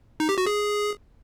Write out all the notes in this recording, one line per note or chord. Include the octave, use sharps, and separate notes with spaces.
D#4
G4
F#4
G#4